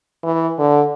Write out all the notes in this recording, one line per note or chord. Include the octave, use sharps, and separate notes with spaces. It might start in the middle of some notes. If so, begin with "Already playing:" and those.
E3
D3